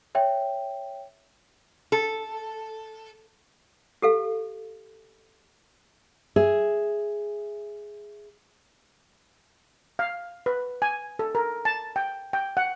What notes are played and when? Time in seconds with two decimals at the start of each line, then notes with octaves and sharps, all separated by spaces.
0.15 C#5 E5 G5
1.92 A4
4.02 G4 A4 F5
6.36 G#4 E5
9.99 F5
10.46 B4
10.82 G#5
11.19 A4
11.35 A#4
11.65 A5
11.96 G5
12.33 G5
12.57 F#5